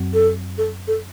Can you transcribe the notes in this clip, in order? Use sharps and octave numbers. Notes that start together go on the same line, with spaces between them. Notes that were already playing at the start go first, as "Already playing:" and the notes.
Already playing: F#2 F#3 C4
A4
A4
A4